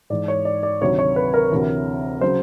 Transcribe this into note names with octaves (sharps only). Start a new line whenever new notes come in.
G#2 E3 D5
C#5
D5
D5
D2 C3 D#3 F#3 C#5
C#5
B4
A#4
D2 C3 E3
C#3 F#3 C5